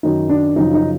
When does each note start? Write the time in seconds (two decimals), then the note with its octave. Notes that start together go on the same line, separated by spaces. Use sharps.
0.03 F#2 D#3 F#3 D#4
0.29 D4
0.56 F#2 C#3 F3 D#4
0.74 D#4